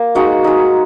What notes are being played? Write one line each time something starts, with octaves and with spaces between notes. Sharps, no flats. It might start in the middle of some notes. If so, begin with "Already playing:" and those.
Already playing: A#3
G#3 D#4 F#4 F#5
G#3 D#4